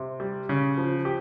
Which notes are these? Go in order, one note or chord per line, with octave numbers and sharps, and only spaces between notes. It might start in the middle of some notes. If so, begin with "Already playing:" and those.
Already playing: C3
G3
C#3
F3
G4